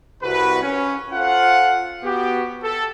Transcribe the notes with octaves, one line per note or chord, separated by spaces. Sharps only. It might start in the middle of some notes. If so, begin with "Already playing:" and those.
C2 F#4 B4
C#4
F4 A4 C5 F5 F#5
B3 F#4 G4
A4